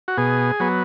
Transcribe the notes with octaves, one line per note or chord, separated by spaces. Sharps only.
F#4
B2 G#4
F#3 B3